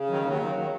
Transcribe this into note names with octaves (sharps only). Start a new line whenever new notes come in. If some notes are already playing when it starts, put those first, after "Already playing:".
Already playing: C#3
D#3 F#3
D#2 F#3
D#3
F#3